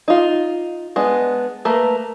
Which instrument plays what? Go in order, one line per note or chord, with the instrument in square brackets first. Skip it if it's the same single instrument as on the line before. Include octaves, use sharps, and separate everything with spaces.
[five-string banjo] D#4 F4
G#3 B3 D4
A3 A#3 A#4 B4